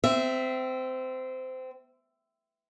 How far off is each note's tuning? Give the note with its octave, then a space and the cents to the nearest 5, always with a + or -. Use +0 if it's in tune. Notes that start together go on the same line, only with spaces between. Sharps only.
C4 -20 E5 +5